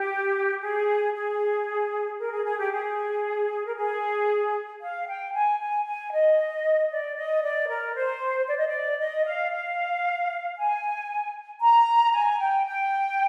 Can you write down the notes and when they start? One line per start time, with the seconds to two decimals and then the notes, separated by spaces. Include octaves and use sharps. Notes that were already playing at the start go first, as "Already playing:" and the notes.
Already playing: G4
0.62 G#4
1.15 G#4
2.19 A#4
2.33 G#4
2.45 G#4
2.59 G4
2.72 G#4
3.65 A#4
3.76 G#4
4.81 F5
5.07 G5
5.33 G#5
5.59 G#5
5.85 G#5
6.12 D#5
6.90 D5
7.16 D#5
7.42 D5
7.69 A#4
7.95 C5
8.47 D5
8.58 D#5
8.68 D5
8.99 D#5
9.25 F5
9.51 F5
10.56 G#5
11.61 A#5
12.13 G#5
12.40 G5
12.66 G5